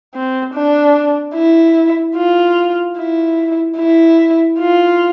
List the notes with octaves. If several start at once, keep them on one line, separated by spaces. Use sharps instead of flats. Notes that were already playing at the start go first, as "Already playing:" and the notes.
C4
D4
E4
F4
E4
E4
F4